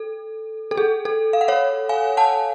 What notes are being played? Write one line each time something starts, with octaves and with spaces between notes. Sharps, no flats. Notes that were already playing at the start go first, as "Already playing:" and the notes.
Already playing: A4
A4
G#4
A4
F5
F#5
C#5 F5
F5 G#5
F#5 A5